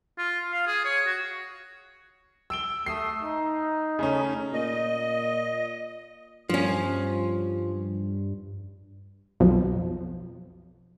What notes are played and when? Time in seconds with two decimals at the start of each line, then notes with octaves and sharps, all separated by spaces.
0.18 F4
0.52 F5
0.67 G#4
0.85 C#5
1.06 F#4
2.50 E6 D7 G7
2.86 A3 D#6 E6 C7
3.23 D#4
3.99 C#3 A3 C#4
4.53 A#2 D#5
6.49 G2 F3 C#4
9.40 B1 F2